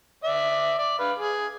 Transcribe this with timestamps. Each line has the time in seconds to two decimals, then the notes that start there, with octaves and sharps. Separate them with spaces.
0.24 D5 E5
0.79 D5
0.99 B4 F5
1.19 G#4